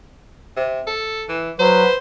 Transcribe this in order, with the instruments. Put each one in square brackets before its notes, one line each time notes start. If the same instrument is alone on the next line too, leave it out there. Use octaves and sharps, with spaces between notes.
[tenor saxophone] C3
A4
E3
[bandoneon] F#3 [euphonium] B4 [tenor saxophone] C5